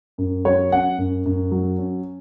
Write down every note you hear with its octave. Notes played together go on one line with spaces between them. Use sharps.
F#2
F#3 C#5
C#4 F#5
F#2
F#2
F#3
C#4